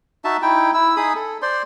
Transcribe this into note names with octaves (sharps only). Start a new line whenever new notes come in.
D#4 F#4 E5 A5
D#4 E4 G5
E4 E6
D#4 G#4 B5 D#6
A4
C5 D5 C6